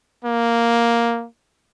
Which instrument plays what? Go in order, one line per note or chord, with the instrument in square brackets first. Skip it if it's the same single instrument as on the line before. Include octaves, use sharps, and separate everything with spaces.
[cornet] A#3